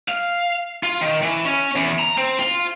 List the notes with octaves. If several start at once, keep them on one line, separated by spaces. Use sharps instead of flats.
F5
F4
D#3
E3
C#4
E2
A#5
C4
F4